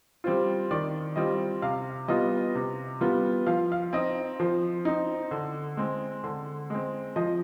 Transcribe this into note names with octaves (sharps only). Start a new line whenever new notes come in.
G3 C4 F4 C5
D#3 D5
G3 C4 F4 D#5
C3 F5
G3 B3 F4 D#5
C3
G3 B3 F4
F3 F5
F5
C4 D#4 D#5
F3 C5
C4 D#4
D3
G#3 C4
D3
G#3 C4
F3 D#5